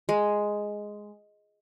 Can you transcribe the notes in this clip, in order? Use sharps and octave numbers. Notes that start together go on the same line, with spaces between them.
G#3